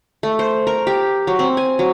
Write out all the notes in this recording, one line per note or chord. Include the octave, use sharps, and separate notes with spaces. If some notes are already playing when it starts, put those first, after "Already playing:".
A3
C5
A#4
G4
F#3
C4
G#5
F#3